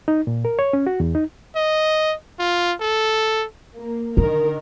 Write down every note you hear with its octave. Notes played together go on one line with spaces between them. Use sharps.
D#4
A#2
A#4
C#5
C#4
F#4
E2
D#4
D#5
F4
A4
A#3
D3 D#3 A#4